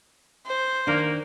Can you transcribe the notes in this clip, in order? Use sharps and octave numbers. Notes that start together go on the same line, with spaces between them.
C5
D#3 A#3 D4